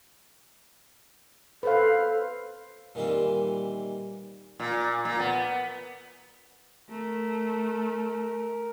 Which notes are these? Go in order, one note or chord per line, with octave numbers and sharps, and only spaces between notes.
A4 B4 C5 F5
A#2 D#3 E3 G3 C4
A#2
A#2
B3
A3 A#4